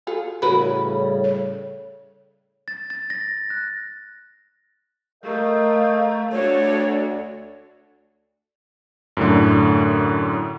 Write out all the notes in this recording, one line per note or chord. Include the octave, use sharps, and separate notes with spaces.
F4 G#4 A4
A2 C#3 G3 F#4 A#4 B4 B5
C#5
A6
A6
A#6
F#6
A3 A#4 D#5 F5 C#6 G6
D2 A3 D4 F#4 C#5 D5
F#2 A2 D3